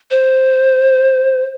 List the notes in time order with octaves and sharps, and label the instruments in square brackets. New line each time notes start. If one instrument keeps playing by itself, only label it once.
[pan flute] C5